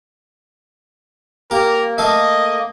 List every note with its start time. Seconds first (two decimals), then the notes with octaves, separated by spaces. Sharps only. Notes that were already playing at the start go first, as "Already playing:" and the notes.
1.51 A#3 G4 A#4
1.98 A3 A4 D#5 F5